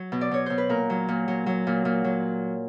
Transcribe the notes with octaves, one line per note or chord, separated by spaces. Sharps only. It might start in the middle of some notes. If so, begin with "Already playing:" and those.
Already playing: F#3
B2
D5
B2 C#5
B2 C5
B4
A#2 A#4
F#3
A#2
F#3
F#3
A#2
A#2
F#3